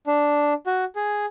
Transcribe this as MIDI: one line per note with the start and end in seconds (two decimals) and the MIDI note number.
0.07 0.53 62
0.67 0.85 66
0.96 1.26 68